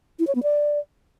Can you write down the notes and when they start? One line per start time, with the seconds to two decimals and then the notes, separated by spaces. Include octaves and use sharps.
0.19 E4
0.27 C#5
0.35 B3
0.43 D5